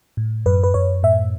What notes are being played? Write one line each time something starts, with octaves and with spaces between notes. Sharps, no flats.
A2
F#2 B4
B4
F#2 C#5
A2 E5